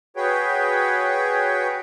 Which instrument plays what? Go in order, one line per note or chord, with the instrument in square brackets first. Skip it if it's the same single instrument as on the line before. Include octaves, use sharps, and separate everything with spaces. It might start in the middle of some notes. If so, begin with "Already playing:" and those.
[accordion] F#4 G#4 B4 C#5 G5